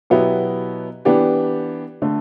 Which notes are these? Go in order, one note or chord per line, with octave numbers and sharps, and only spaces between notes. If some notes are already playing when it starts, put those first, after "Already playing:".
B2 F#3 B3 E4 G4
E3 B3 D4 G4
D3 A3